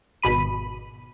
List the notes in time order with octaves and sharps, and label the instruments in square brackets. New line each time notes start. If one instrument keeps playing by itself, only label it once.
[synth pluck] G#1 B2 B5 D#7